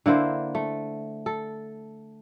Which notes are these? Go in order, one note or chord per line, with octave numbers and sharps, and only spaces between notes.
D3 A#3 E4 C5
A3
A4